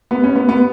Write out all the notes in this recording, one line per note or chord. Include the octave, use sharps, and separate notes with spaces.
B3
C#4
B3
B3